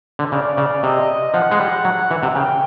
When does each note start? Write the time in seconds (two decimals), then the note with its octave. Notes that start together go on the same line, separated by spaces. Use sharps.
0.19 D3
0.32 C#3 D5
0.57 C#3
0.83 C3 D#5
1.34 F3 F#5
1.51 G#3
1.60 G3
1.85 F#3
2.11 E3
2.23 C3
2.35 C#3 G5